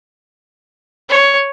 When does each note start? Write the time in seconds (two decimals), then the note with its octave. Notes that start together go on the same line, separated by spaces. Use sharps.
1.09 C#5